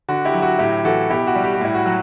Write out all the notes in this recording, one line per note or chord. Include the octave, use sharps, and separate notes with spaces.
D3 F#4
E4 G4
F#3
F#4
A2 E4 G4
E3 F#4 A4
B2 E4 G4
F#4
G3
G4
F#4
A2 E4
F#4
F#3